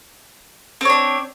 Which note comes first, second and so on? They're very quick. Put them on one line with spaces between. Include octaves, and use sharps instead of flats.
C4 C#5 D4